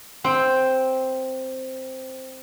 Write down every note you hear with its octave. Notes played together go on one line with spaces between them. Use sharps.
C4 C5 G5